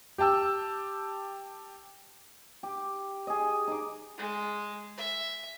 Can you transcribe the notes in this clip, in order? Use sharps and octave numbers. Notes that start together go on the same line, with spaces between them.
G4 G5 A5 E6
G4
G#4 D#5
D#4 D6
G#3
E5